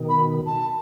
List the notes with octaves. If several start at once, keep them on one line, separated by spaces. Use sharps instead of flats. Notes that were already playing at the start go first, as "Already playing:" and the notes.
Already playing: B2 D#3
B5
A5